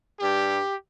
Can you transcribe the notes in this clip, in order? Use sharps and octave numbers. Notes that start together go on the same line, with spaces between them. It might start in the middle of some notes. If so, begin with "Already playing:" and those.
G2 G3 G4